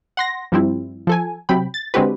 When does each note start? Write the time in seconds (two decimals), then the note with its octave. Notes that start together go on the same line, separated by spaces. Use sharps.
0.17 F#5 C6 A#6
0.52 G2 F3 G3 C4 E4
1.07 F3 A4 G#5
1.49 C3 F#3 G5 B5
1.74 A6
1.94 D3 G#3 C4 F#4 G4 B4